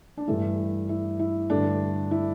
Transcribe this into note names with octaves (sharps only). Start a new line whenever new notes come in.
D4
G2 E3 A3 E4
E4
E4
G2 D3 A3 D4
E4